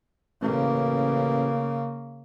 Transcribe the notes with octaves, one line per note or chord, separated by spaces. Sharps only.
A1 C#3 A#3